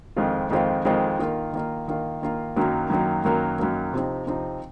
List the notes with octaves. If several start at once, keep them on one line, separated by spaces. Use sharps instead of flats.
F2 D#3 G#3 C4 F4
F2 D#3 G#3 C4 F4
F2 D#3 G#3 C4 F4
D#3 A#3 F4
D#3 A#3 F4
D#3 A#3 F4
D#3 A#3 F4
F#2 D#3 F#3 A#3
F#2 D#3 F#3 A#3
F#2 D#3 F#3 A#3
F#2 D#3 F#3 A#3
C3 F3 C4 D#4
C3 F3 C4 D#4